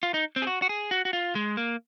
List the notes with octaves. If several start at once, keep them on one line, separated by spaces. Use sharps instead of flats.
F4
D#4
C4
G#4
F#4
F#4
G#4
F#4
F#4
F4
G#3
A#3